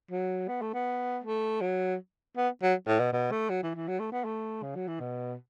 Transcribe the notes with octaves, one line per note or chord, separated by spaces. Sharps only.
F#3
B3
A3
B3
A3
F#3
B3
F#3
A2
B2
B2
A3
F#3
E3
E3
F#3
A3
B3
A3
C#3
F#3
E3
B2